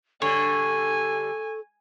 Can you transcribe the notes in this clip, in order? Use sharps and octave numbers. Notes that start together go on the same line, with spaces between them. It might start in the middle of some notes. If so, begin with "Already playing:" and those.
D3 G3 A4 C#5 G#5